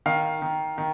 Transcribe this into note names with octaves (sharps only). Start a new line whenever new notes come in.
D#3 F5
D#3
D#3